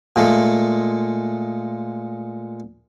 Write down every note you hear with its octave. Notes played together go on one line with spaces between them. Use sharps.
A#2 G#3 A3